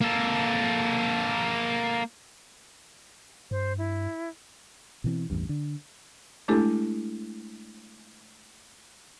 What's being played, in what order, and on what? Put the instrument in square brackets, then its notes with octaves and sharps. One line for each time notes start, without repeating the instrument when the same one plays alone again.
[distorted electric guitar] A#3 A4
[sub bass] G2 [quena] C5
[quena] E4
[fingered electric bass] B2 E3 C4
A1 E2 G2
D3
[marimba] G#3 A3 D4 E4 G4 A4